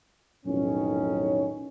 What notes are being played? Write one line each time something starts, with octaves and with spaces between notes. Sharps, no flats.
B1 F2 A2 D#3 C#4